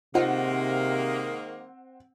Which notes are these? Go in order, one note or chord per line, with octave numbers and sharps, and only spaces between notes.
C3 D#3 G#3 A#3 C4 D#4 F4 F#5